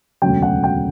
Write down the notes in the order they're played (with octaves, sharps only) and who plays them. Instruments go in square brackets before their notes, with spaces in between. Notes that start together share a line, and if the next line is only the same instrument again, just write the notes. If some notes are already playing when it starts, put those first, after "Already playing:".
[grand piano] E1 D2 C#3 F#3 G5
F#5
G5